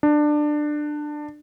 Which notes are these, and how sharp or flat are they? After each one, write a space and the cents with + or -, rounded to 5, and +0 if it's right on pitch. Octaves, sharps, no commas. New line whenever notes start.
D4 +20